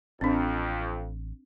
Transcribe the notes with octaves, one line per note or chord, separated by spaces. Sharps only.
A1 F2 C4 D4